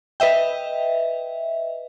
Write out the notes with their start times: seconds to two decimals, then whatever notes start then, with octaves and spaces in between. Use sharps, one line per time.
0.20 B4 D#5 E5 G5